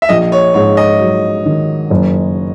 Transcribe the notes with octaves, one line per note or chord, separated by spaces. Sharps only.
E5
A#1 D#5
C#5
G#2 C#5
D#5
F#3
D#3
F#1